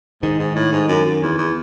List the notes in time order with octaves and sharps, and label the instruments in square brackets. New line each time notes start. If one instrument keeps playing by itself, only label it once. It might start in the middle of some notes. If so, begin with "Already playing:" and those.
[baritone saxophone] G#2 [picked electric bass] D#3
[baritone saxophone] G#2
A2
G#2
F#2
F#2
E2
E2